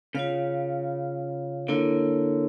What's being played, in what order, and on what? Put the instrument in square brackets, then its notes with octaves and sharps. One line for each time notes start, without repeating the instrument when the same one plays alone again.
[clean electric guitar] C#3 [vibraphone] F4 C#5 F5
[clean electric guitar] D3 [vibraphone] A#3 E4 A#4 C#5